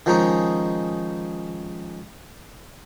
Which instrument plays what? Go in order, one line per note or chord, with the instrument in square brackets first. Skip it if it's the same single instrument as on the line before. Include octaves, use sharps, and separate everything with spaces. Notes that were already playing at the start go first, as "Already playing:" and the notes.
[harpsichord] D#3 F3 G#3 C#4 D#4